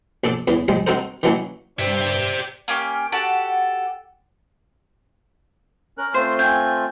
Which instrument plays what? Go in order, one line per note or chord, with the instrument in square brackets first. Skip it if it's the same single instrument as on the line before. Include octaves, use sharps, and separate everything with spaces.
[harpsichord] A#1 D4 A4 D6
E2 C#3 E3
F3 G3 G#3 D#5
C4 D#4 F#4 A4 A#4 C5
D#3 E3 F#3 A#3 C#4 E4
[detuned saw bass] G2 [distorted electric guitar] G4 E5 [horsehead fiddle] C5 D5
[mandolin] A#3 C#4 G4
F#4 G4 A4 F#5
[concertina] C#4 A#4 F#6
[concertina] A3 C4 F4 [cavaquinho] C5
[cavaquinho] G5 G#5